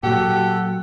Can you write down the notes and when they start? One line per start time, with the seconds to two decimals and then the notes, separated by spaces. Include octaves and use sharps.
0.03 A#2 F#3 F#4 G4 A4 F#5